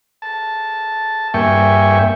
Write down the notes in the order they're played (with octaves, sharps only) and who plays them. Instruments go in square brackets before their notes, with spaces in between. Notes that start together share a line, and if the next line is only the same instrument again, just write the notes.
[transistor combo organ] A5
G2 A#3 E5 G5 G#5 C#6